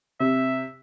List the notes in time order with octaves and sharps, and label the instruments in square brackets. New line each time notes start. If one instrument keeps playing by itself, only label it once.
[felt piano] C3 [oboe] E5